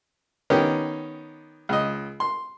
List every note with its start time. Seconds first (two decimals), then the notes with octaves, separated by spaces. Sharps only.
0.50 D#3 B3 C#4 D#4 G4
1.69 C#2 D#5
2.20 C6